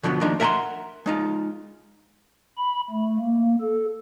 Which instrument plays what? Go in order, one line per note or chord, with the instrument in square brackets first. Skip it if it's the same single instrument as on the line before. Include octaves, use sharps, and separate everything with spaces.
[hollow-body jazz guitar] B2 D3 F3 F#3 B3
D#2 F3 D4 D#4
A#4 E5 F#5 G#5 A#5 C6
G#3 D#4 F4
[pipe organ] B5
A3
A#3
A4